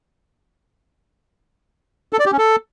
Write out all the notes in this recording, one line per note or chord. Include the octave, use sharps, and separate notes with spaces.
A4
D5
G4
C#4
A4